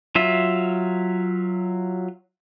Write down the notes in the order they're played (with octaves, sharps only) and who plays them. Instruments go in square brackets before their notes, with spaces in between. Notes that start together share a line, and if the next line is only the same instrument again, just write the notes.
[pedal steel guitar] F#3 F4 E5